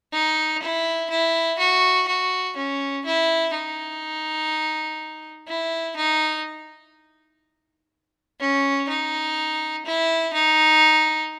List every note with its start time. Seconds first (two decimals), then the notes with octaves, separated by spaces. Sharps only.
0.13 D#4
0.62 E4
1.10 E4
1.59 F#4
2.08 F#4
2.57 C#4
3.06 E4
3.54 D#4
5.48 E4
5.96 D#4
8.40 C#4
8.88 D#4
9.86 E4
10.34 D#4